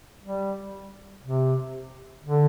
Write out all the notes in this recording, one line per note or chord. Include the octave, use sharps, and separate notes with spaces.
G3
C3
D3